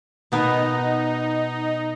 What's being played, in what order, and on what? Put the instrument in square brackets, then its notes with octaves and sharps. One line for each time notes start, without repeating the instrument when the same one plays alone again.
[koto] B2 B3 A#4 [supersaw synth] D#4